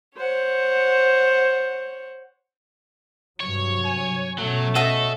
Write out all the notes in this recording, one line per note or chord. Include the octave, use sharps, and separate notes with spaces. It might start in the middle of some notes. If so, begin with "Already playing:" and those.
C5 C#5 F#5
G2 C3 F#3 C#5
G#5
B2 F#3 A3 C#4
F#4 A4 D#5 E5